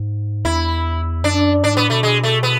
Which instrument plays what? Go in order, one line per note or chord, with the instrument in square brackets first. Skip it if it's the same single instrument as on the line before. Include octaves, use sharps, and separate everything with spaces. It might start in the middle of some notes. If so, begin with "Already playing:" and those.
Already playing: [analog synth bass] G#2
[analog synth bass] E2 [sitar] E4
[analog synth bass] F#2 [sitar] D4
[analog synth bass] G#2 [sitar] D4
[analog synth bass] A2 [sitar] B3
[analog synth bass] B2 [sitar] A3
[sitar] G#3
A3
B3